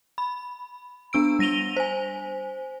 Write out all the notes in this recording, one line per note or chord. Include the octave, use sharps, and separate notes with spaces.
B5
B3 D4 E6 D7
G3 A#6 D#7 F7 G7
C5 G#5